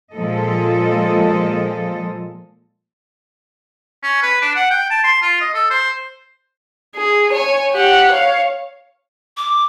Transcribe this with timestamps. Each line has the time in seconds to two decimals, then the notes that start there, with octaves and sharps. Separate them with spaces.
0.13 A#2 F3 G#3 A4 D#5
4.03 C#4
4.22 B4
4.42 D4
4.56 F#5
4.71 G5
4.90 A5
5.04 C6
5.22 F4
5.41 D#5
5.54 A4
5.70 C5
6.96 G#4
7.32 C#5 G#5
7.73 G4 F#5
8.12 C#5 F5
9.37 D6